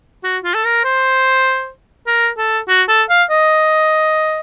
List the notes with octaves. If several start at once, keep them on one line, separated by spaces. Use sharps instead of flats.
F#4
F4
A4
A#4
C5
A#4
A4
F#4
A4
F5
D#5